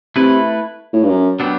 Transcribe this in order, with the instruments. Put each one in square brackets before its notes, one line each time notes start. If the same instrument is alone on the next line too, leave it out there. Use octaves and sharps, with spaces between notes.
[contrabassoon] C3 [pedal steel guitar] A3 E4 B4
[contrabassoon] A2
G2
F#2
[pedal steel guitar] F#3 B3 D4 G4